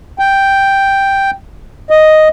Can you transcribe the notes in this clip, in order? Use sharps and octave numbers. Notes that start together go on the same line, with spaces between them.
G5
D#5